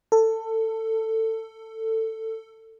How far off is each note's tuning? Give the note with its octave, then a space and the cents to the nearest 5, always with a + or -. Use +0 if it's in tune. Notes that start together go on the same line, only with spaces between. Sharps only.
A4 +20